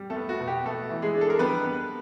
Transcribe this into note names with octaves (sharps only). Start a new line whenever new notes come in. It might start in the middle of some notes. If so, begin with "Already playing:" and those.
Already playing: G3
A3 A4
B3
F#4
B2
G4
A3 B3 A4
E3
G#3 G#4
D4
A4
A#4
G3 B3 B4
B3